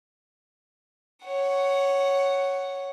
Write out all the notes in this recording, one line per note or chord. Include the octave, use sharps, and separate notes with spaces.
C#5 F#5